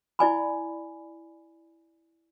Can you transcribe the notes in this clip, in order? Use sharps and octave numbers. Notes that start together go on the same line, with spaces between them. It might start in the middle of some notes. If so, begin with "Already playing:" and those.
E4 D5 G#5 B5